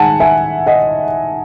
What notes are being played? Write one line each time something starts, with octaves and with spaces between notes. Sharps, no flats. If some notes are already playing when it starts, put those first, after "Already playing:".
Already playing: D#3 G#3 F#5 G#5 A5
E5 G#5
D#5 F#5